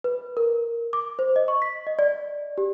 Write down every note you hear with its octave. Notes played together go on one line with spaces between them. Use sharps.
B4
A#4
D6
C5
D#5
C#6
B6
D#5
D5
G4